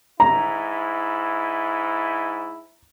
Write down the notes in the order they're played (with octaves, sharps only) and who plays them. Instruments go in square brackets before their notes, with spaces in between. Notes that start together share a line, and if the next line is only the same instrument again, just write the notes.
[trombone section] G#2 E4 [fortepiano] A#5